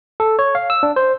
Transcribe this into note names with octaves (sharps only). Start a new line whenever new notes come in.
A4
C#5
F5
E6
D4
C5